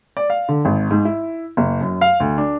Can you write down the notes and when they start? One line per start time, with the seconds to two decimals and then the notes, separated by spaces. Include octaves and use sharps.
0.17 D5
0.30 F5
0.49 D3
0.65 G#1
0.91 G#2
1.05 E4
1.57 F#1
1.81 F#2
2.01 F5
2.20 D2
2.38 D4